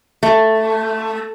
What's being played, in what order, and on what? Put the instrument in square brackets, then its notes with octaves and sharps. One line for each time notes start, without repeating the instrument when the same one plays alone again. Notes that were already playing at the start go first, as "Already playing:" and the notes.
[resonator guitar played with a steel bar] A3